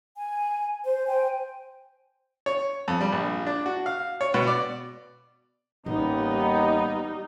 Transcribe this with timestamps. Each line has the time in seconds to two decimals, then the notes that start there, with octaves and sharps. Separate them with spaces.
0.16 G#5
0.84 C5
1.06 C5 G5 G#5
2.46 C#5
2.88 F2
3.01 G3
3.12 A#1
3.46 D4
3.66 F#4
3.86 F5
4.21 C#5
4.34 B2
4.47 D5
5.86 A1 D#2 G3 B3 D#4